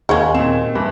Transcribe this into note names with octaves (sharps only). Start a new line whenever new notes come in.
D#2 C#3 F#3 G#3 C#6 G#6
A#2 C4 E7
G2 E3